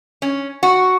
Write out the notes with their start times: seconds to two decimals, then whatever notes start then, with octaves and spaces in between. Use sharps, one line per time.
0.22 C#4
0.63 F#4